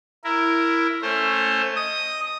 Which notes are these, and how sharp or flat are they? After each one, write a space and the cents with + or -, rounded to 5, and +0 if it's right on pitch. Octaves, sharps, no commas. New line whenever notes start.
E4 +10 A#4 +0
A3 +10 C#4 +0 C5 +20
D#5 +0 D#6 +0